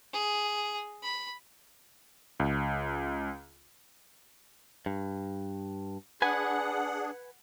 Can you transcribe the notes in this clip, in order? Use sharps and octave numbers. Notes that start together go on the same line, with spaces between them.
G#4
B5
C#2
G2
D4 G#4 B4 F#5 G#5